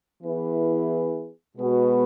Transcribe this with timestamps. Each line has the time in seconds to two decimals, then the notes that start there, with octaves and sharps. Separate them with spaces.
0.22 E3 B3 E4 G#4 B4
1.57 B2 G#3 B3 F#4 B4